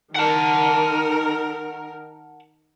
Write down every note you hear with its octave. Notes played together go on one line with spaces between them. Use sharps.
D#3 A#4 F#5 A5